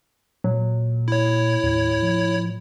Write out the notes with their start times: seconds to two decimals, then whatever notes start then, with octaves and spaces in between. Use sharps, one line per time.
0.44 A#2 F#3
1.08 E4 C#5
1.64 D#2 A2
2.02 F3